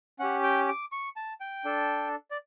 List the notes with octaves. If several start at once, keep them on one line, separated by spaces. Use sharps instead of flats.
C#4 G4 F#5
G5
D6
C#6
A5
G5
D4 A4
D5